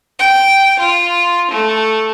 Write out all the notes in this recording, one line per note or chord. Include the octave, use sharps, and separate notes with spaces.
G5
F4
A3